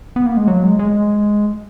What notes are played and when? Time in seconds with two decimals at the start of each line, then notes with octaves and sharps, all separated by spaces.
0.16 B3
0.26 A#3
0.37 G#3
0.48 F#3
0.63 G#3
0.79 G#3